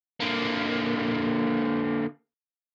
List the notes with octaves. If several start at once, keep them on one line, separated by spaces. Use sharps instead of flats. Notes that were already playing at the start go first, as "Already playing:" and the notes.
D3 A#3